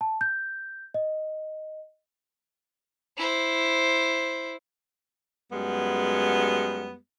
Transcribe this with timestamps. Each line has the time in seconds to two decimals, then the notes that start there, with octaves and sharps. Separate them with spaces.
0.01 A5
0.21 G6
0.94 D#5
3.17 E4 C5
5.50 F#2 G3 G#3 B3